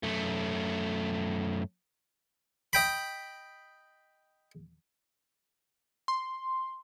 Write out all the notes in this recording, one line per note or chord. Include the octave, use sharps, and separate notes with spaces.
F#2 A3
D#5 G5 B5
C6